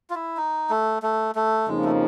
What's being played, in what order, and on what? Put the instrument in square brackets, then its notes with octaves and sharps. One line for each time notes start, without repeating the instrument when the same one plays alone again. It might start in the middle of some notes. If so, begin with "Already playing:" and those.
[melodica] F4
E4
D#4
A3
A3
A3
[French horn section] F2 C#3 F3 A#3 D#4 [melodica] G#3
[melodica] A3